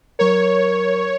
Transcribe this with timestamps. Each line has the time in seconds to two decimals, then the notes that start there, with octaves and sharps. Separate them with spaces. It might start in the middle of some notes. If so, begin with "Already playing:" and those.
0.19 F#3 A#4 C#5